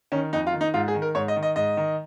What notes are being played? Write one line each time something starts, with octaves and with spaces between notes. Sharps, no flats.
D#3 C#4
F2 D#4
F4
D#3
D#4
G#2 F4
G#4
D#3
A#4
G#2 C#5
D#5
D#3
D#5
G#2 D#5
D#3